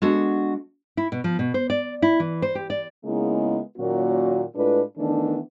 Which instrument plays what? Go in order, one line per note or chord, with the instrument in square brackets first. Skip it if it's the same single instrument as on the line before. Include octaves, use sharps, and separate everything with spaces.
[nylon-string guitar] G#3 B3 D4 F#4 A4
E4
B2
F3
B2
C5
D5
E4
E3
C5
G4
D5
[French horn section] C#3 G#3 A#3 B3 D#4 E4
A#2 D#3 F#3 A#3 C#4 F#4
A2 G#3 D4 F4 B4
D#3 E3 A3 B3 D4